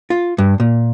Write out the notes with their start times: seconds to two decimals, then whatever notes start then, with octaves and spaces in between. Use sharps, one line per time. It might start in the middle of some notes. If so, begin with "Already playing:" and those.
0.10 F4
0.38 G2
0.60 A#2